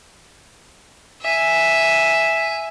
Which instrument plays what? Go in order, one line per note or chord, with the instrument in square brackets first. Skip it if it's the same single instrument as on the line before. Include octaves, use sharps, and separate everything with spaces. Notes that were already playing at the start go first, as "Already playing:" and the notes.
[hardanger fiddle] E5 G#5